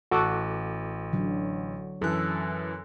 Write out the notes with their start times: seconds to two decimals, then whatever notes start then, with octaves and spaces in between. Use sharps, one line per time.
0.11 A1 F#4 A4 D6
1.13 D3 F#3
2.02 F#2 E3 A4 F#6